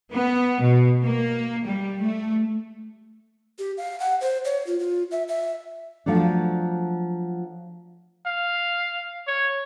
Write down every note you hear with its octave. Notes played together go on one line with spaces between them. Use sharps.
B3
B2
A#3
G3
A3
G4
F5
F#5
C5
C#5
F4
F4
E5
E5
F3 F#3 A3 D4
F5
C#5